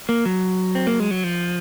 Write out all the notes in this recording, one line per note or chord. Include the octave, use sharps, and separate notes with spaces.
A#3
F#3
C4
A#3
G#3
F#3
F3